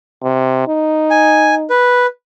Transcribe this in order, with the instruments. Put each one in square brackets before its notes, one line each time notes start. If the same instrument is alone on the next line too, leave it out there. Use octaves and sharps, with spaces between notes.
[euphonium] C3
D#4
[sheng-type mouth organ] G#5
B4